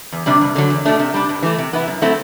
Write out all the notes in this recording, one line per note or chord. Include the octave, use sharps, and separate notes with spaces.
E2
C3 G3 D4
G2
D3 F#3
E2
B2 A3 D4
C3
G3 D4
G2
E3 A3
C3
E3 B3 E4
F#2
F#3 A3 C4 E4